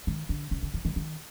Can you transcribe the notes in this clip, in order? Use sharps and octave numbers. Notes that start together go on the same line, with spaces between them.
D#3
D3
C#3
D3
E3
D#3
D#3